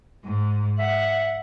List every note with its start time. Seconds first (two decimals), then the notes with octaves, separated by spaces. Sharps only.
0.25 G#2
0.79 E5 F#5